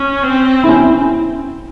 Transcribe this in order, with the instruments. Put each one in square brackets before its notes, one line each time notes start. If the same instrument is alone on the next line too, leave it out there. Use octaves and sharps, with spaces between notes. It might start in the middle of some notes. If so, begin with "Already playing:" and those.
Already playing: [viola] C#4
C4
[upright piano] E4
C#4
E4